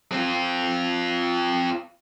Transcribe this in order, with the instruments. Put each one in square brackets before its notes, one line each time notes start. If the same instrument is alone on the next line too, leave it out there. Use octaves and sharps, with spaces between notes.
[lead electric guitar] C4 F4